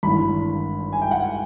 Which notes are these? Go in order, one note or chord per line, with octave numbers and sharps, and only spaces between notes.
G#1 G2 E3 B5
G#5
G5
F#5